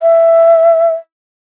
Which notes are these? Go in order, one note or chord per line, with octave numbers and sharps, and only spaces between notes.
E5